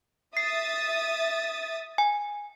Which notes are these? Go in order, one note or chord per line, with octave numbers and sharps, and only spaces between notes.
E5 D#6 A6 C7
G#5